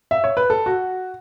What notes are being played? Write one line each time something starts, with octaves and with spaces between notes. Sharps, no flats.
E5
C#5
B4
A4
F#4